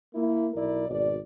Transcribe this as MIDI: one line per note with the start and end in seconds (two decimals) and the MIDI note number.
0.15 0.49 58
0.15 0.49 64
0.54 0.88 35
0.54 0.88 64
0.54 0.88 70
0.54 0.88 74
0.89 1.18 32
0.89 1.18 47
0.89 1.18 74